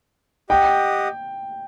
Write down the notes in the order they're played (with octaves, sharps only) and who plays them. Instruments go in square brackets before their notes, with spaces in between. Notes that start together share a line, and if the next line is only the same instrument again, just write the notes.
[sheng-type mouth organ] G4 D#5 F#5 [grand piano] G5